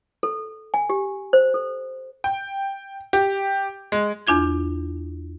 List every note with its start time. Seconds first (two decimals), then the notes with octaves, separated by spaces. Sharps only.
0.23 A4
0.74 G#5
0.90 G4
1.33 C5
1.54 A4
2.24 G5
3.13 G4
3.92 G#3
4.27 E2 D4 F4 G#6